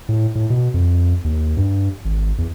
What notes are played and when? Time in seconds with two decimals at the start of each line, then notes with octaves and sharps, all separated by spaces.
0.09 A2
0.35 A2
0.50 B2
0.74 F2
1.24 D#2
1.57 G2
2.05 G#1
2.38 E2